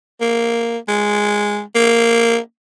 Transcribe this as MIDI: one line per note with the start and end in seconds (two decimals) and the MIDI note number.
0.21 0.78 58
0.88 1.60 56
1.75 2.38 58